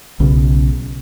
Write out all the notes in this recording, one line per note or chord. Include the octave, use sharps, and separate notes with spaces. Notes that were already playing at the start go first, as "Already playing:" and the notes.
B1 C#3